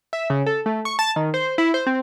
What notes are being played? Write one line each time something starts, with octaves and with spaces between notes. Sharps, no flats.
E5
C#3
A4
A3
C#6
A5
D#3
C5
E4
C5
C4